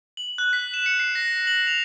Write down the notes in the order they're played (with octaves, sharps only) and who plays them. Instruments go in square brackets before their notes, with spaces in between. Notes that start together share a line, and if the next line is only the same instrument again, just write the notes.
[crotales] F#7
F#6
B6
E7
C#7
C7
A#6
C7
F#7
F7